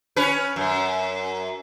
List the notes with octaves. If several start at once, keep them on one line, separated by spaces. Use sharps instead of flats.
C#4 B4
F#2